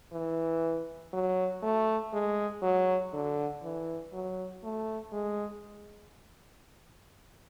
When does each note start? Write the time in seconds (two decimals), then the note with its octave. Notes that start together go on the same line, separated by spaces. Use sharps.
0.13 E3
1.13 F#3
1.62 A3
2.13 G#3
2.62 F#3
3.13 D3
3.63 E3
4.13 F#3
4.63 A3
5.12 G#3